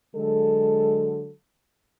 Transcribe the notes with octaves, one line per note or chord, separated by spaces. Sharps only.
D3 F#3 G#3 A4